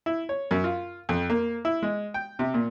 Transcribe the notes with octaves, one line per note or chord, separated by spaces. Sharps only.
E4
C#5
F#2
F4
F2
A#3
E4
G#3
G5
C3
A#2